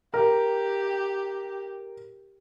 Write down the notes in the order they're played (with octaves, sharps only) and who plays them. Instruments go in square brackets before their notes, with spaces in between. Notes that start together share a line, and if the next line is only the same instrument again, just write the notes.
[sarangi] G4 [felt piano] A#4